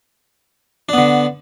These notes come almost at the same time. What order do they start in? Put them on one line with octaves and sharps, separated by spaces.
D4 B3 D3